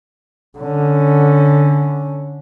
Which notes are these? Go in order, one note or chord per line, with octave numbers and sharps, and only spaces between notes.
D3 C#4